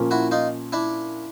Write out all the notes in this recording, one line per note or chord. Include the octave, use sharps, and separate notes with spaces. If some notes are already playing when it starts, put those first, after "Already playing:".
Already playing: A#2 F3 A#3 C#4
E4 F#4
D#4 F4
D4 E4